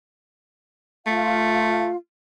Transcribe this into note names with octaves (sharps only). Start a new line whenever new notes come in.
A3 F4 F5